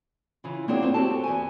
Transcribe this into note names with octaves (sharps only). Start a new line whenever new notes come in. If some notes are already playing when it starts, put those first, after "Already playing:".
C#3 E3 F4
A#3 C4 D4 F#4 G#4 C#5
C4 F4 C5 C#5
C4 F#4 G4 A4 A5
E2 G#5